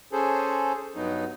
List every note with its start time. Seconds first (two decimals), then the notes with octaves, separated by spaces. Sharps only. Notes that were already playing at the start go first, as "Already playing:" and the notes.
0.12 C#4 G#4 A4 C5
0.96 G2 F#3 B3 D#4